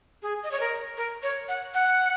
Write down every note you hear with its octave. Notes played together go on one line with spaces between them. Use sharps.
G#4
D#5
C#5
A#4
A#4
C#5
F#5
F#5